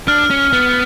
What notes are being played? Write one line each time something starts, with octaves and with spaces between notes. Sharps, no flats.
D4 F6
C#4
B3